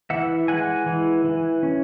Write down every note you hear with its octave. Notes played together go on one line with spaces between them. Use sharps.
E3 E5 F#5
G#3 F#5 G#5
E3
E3
C#4